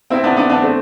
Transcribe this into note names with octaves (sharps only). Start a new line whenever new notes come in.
C4 E4
B3 D4
B3 D4
B3 D4
A3 C4